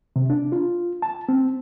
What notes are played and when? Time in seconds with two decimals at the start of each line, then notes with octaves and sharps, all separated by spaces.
0.16 C3
0.30 D4
0.52 F4
1.02 A5
1.29 C4